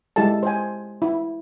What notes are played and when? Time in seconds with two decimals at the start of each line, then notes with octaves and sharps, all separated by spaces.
0.16 G#3 E4 G4 A4 A5
0.43 C5 G#5
1.02 E4